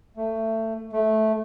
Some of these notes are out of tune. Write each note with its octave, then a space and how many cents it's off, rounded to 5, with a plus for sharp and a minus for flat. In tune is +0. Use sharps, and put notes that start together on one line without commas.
A3 +20
A3 -10